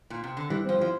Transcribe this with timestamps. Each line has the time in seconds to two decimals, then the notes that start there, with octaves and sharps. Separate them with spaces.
0.10 A#2
0.24 C3
0.37 D3
0.50 E3 G3
0.65 F3 C4
0.79 F3 E4